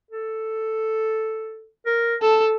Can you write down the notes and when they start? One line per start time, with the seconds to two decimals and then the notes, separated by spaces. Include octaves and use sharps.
0.11 A4
1.86 A#4
2.22 A4 A5